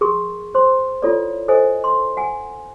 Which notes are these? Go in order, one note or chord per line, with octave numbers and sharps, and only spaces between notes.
G#4 A#4 C6 C#6
C5 C6
E4 F4 A4 C#5 D5
A4 C5 D#5 G#5
C6
F#5 G#5